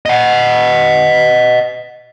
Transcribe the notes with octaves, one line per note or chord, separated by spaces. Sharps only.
D#5 F#5